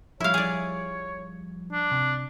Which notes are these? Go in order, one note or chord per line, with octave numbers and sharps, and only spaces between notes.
F3 G3 E4 C#5 F5
G#4 D5
D4
C3